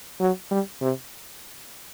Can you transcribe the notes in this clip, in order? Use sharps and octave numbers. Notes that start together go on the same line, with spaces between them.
F#3
G3
C3